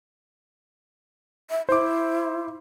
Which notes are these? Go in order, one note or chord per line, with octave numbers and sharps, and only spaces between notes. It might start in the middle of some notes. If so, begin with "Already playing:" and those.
E5
E4 C5 D6